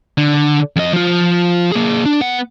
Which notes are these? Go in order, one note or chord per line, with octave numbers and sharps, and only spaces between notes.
D3
F2 D#5
F3 F4
A#3 G#4
D4
B3 F#5